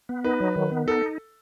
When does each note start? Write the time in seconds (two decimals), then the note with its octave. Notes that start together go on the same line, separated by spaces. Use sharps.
0.09 B3
0.24 D#4 B4
0.40 F#3
0.56 D#3
0.72 B3
0.87 D#4 A4